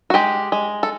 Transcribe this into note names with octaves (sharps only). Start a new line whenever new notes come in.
F#4
G#3 G4
G#3
A4